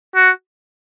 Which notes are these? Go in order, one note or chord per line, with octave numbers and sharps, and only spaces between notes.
F#4